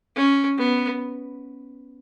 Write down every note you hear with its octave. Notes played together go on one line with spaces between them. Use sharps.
C#4
B3